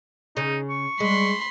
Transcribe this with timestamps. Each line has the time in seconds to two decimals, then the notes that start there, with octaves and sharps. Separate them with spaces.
0.37 C#3 D#4
0.70 C#6
1.00 G3 G#3 B5 C6